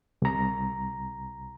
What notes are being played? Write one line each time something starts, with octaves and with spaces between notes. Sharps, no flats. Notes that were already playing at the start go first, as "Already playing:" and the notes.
C2 A#5